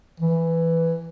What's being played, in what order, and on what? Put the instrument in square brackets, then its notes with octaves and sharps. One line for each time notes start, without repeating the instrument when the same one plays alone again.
[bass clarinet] E3